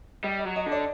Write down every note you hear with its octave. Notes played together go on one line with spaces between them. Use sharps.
G3 D#5
D#5
F#3
D#5
D3
D5